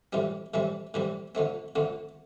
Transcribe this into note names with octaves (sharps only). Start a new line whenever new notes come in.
A2 E3 G3 C4
A2 E3 G3 C4
A2 E3 G3 C4
F2 D3 A3 C4
F2 D3 A3 C4